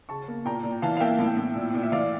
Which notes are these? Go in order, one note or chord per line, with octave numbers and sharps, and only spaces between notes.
C#3 A5 C#6
A#3
A#2 G5 A#5
A#2
E3 F5 A5
F5
A#3 E5 G5
A2
A2
A#2
A#2
E5
E3 D5 F5